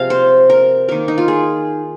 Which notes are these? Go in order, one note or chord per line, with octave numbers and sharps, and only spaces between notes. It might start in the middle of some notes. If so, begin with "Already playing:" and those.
Already playing: C3 F3 G#3 F5
C5
A#4
D#3 A#3 A#4
D#4
F4
G#4